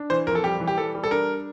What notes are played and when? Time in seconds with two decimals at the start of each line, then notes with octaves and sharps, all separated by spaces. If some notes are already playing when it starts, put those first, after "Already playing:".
Already playing: D4
0.10 E3 C5
0.27 F2 A#4
0.35 A4
0.44 G3 G4
0.60 E3
0.67 G4
0.78 G3 A4
0.95 G3
1.04 A4
1.11 D4 A#4